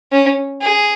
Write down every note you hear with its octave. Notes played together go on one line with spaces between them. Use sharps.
C#4
G#4